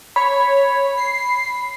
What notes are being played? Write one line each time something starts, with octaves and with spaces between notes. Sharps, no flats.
C#5 B5
C7